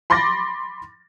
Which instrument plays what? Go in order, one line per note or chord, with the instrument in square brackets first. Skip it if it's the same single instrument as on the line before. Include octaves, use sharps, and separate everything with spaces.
[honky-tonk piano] B5 C6 D6 A6 A#6